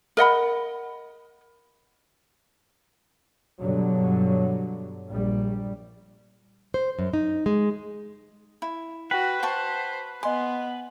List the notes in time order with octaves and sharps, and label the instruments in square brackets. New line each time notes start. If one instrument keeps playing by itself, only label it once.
[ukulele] A#4 D#5 F#5 B5
[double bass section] G2 B2 D3 F#3
A#1 G3
[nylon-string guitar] C5
F#2
D#4
G#3
[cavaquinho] E4
[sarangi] F#4 [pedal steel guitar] B4 [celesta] G5
[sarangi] C5 [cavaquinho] F#5 A5 C#6
[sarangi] B3 [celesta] D#5 G#5 [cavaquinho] C6